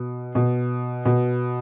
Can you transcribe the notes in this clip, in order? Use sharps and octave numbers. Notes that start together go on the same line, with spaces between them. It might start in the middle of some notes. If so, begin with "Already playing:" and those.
Already playing: B2
B2
B2